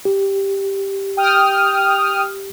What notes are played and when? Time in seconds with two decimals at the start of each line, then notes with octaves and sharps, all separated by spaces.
0.05 G4
1.17 G5 D#6 F6